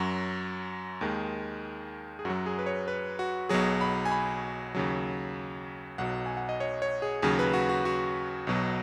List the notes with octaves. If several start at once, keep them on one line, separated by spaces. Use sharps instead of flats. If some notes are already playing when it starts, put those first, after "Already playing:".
Already playing: F#2 F#3 F#4
D#2 D#3 G#3
G#4
F#2 F#4
F#3
G#4
B4
C#5
B4
F#4
B1 B2 F#3 G#4
B5
G#5
B5
D#2 C#3 F#3
B1 B2 F#3 F#5
G#5
F#5
D#5
C#5
C#5
G#4
D#2 C#3 F#3 G#4
B4
F#4
F#4
F#4
B1 B2 F#3